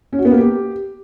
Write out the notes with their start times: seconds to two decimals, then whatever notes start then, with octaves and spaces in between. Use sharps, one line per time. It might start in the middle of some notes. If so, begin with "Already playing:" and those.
0.13 C#4
0.19 F#4
0.25 B3
0.31 A#3
0.38 G4